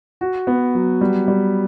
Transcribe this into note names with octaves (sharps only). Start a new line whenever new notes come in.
F#4
B3
F#3
G3
G3